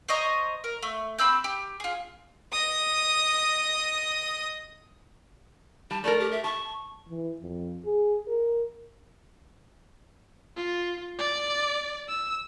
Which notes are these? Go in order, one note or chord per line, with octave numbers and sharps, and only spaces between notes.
C5 C#5 D#5 A#5
A#4
A3
C4 B5 E6 G6
G4
F4 G#4
D#5 D#6
G3 A5
A3 A4 A#4 D5
G4
E5
A5 C#6
E3
F2
G#4
A#4
F4
D5
E6